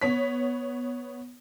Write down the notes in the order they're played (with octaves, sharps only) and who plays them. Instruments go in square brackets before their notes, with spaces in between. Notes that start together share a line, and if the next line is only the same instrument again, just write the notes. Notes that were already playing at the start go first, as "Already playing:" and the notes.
[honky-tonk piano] B3 C#5 B6